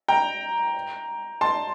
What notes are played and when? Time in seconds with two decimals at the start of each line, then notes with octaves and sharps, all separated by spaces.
0.08 G5 A#5
1.41 A5 C6